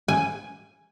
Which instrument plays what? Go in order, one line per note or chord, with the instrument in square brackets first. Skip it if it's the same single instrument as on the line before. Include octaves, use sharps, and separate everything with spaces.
[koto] G#5